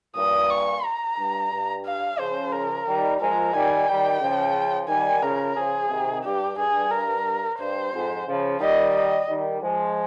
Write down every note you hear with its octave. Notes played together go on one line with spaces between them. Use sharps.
G2 A#2 D#6
C#6
A#5
G2
G2
F5
C#3 F3 C5
A#4
D#3 G3
F3 G#3 A#4
D#3 G3 G#5
D#3 G3 G5
C#3 F3
D#3 G3 G#5
C#3 F3 A#4
C#3 F3 G#4
C3 D#3
G2 G4
G2 G#4
A#4
G2 C5
F2 G#2
C#3 F3
D#3 G3 D#5
D#5
D#3 G3
F3 G#3